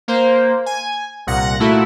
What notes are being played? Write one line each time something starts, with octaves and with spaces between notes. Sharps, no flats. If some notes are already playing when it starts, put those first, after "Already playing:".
A#3 C5
G#5
C2 A#2 F#5 A#6
A#2 A3 E4 F#4